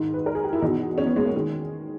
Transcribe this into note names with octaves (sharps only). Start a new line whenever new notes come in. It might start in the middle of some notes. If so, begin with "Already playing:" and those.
Already playing: G#2 D#3 D#4
B4
A#4
G#4
G4
E4
E2 B2 D#4
C#4
B3
G#3
A#3
D#3 G#3